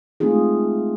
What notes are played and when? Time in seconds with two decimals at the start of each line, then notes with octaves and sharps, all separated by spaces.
0.20 G#3 A3 C4 D#4 F4 G#4